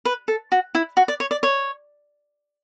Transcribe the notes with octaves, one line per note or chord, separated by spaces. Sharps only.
B4
A4
F#4
E4
F#4
D5
C#5
D5
C#5